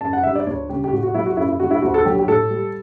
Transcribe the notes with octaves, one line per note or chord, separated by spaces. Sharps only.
F#2 A5
F#5
D3 G3 E5
D5
D2 C#5
C#3 G3 G4
G4
A2 F#4
F#4
F#3 E4
F#4
F#2 E4
E4
D3 G3 F#4
E4
D2 F#4
A4
D3 F#3 G4
G4
A2 A4
G3